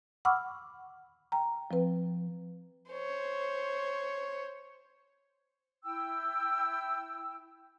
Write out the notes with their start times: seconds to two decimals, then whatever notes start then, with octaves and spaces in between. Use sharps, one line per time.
0.25 F#5 B5 C#6 D6 E6 F6
1.32 G5 A#5
1.71 F3 C4 B4
2.90 C5 C#5
5.84 E4 G5 E6